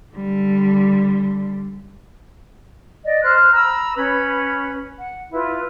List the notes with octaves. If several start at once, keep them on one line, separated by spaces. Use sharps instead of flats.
D3 G3
D5 D#5
C5 F6 F#6
A#5 B5 E6
C#4 B4 C#5 B5
F#5
E4 F4 B4